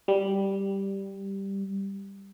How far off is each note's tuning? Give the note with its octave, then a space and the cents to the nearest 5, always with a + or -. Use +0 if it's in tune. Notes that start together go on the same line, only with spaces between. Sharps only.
G3 +0